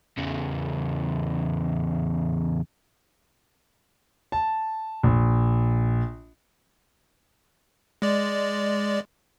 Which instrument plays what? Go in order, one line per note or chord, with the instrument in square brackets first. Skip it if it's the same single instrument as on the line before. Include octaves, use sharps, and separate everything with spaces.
[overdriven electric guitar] E2 C#3
[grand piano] A5
A#1
[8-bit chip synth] G#3 D5